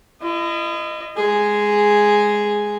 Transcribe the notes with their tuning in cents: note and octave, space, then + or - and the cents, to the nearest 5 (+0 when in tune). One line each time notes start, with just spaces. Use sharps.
E4 +40 D#5 -10
G#3 +0 G#4 +0